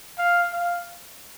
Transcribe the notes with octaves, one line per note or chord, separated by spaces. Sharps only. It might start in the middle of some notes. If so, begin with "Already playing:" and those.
F5
F5